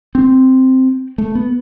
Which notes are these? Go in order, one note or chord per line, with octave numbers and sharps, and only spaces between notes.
C4
A3
B3